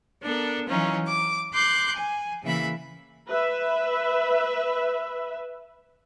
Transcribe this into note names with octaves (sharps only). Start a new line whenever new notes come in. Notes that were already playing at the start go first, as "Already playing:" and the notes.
B3 D4 A4 A#4
E3 F#3 C#4 D#4 F4
D6
C6 D6 F#6 G6
G#5
C#3 E3 A#3 E5 B5
B4 E5